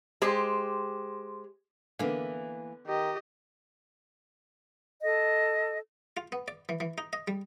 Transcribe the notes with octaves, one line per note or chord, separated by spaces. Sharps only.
G#3 G4 C5
D3 E3 A#3 B3
D#3 G4 D#5
A4 D#5
F4
B3
D5
E3
E3
D#4
D#5
G3